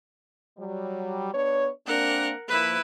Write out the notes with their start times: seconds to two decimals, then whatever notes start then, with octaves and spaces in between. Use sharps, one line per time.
0.57 F#3 G3
1.33 B3 D4 C#5
1.87 A#3 C4 D4 A#4 F#5
2.48 F3 A#3 E4 B4